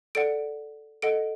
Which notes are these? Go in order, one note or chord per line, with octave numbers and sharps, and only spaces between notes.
A4 D5 F#5 D7
A4 D#5 F#5 D7